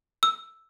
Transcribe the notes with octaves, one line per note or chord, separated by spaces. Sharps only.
E6